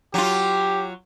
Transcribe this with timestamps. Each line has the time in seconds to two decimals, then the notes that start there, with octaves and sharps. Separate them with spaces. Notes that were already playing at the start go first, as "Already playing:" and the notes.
0.14 F#3 F4 G4